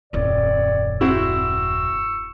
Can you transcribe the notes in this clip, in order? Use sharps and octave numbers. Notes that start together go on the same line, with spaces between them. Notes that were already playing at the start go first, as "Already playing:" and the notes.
D#1 F#2 C4 C#5 D5
C4 E4 F#4 C#6 E6